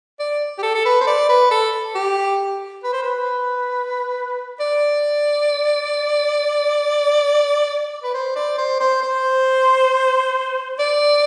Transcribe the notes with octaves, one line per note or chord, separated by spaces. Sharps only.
D5
G4
A4
A4
B4
C5
D5
B4
A4
G4
B4
C5
B4
D5
B4
C5
D5
C5
C5
C5
D5